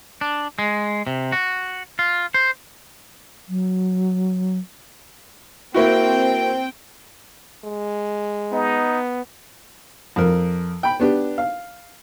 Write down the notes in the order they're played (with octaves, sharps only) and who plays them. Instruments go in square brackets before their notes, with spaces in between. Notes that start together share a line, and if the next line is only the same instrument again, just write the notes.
[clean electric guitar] D4
G#3
C3
F#4
F4
C5
[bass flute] F#3
[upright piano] A#3 E4 F#4 [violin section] C4 G5
[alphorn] G#3
[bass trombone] B3 [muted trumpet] D#4
[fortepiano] F2 A#4
G5 B5
B3 D4 G4
F5